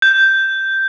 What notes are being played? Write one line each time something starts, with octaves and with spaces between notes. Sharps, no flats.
G6